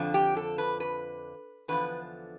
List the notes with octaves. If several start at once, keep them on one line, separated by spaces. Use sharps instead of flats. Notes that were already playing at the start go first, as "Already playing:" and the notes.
Already playing: F2 D3 F3
G4
A4
B4
B4
E2 D3 F3 B4